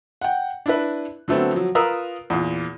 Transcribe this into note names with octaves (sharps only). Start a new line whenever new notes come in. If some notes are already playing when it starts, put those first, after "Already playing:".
F#5 G5
D4 E4 B4
D3 F#3 A3 B3 C4
F3 F#3
F4 A#4 B4 A#5 D#6 E6
E2 A#2